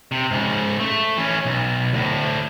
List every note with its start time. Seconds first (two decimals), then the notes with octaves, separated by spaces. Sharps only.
0.12 C3
0.31 G#2 C#3
0.80 A3
1.17 E3 C#4
1.46 B1
1.93 D2 A2